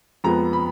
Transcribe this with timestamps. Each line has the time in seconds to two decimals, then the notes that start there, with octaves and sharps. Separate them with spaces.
0.24 F2 F3 G#3 B3 A#5
0.53 B5